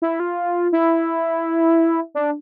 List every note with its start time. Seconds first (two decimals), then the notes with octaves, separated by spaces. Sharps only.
0.02 E4
0.20 F4
0.73 E4
2.15 D4